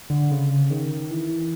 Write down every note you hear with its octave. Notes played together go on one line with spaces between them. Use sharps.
D3
C#3
D#3
E3